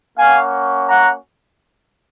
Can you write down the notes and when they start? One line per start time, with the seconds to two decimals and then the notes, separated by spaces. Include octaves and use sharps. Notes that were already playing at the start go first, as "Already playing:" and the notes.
0.17 A#3 C#4 F#4 F5 G#5
0.88 F#5 A#5